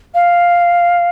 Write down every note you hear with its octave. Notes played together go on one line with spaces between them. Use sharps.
F5